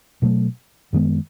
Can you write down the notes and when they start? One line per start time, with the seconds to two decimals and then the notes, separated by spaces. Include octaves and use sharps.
0.22 B2 F#3 A3
0.93 F#2 D#3 G#3 B3